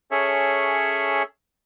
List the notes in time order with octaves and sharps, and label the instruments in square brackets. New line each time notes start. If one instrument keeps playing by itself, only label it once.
[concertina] C#4 G#4 A4 C#5 E5